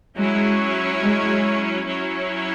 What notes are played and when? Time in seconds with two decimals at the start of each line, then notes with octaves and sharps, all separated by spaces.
0.16 F#3 G#3 C#4 E4 C#5
1.02 G#3
1.86 F#3 C#4 E4 C#5